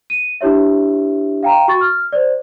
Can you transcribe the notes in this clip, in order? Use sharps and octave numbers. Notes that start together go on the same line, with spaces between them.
D#7
D4 E4 G4 C#5 E5
F5 G5 A#5
F#4 C#6 A6
F6
C5 D5